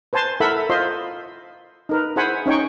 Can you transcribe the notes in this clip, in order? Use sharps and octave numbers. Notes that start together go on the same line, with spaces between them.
B4 C5 G#5 A5 C6
E4 A4 A#4 E5 F#5 B5
F4 C5 D#5 C6
D#4 A#4 B4
E4 G#4 C5 F#5 G#5 B5
C#4 D#4 C#5 G5 C#6